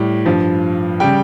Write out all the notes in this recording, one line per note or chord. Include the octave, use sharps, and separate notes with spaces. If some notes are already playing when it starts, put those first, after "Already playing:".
Already playing: A2 G3
G2 F3
C#3 G3 G5